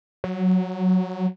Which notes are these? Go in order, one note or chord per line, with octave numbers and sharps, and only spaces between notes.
F#3